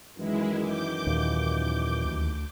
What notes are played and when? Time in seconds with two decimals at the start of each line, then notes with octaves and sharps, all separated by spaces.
0.17 F#2 D#3 E3 G#3 E4
0.61 D6 G6
1.07 D#2 A#2
2.05 D2